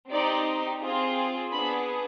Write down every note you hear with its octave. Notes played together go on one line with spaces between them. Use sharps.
C4 D#4 G4 D5
C4 F4 G#4
B3 D4 G#4 B5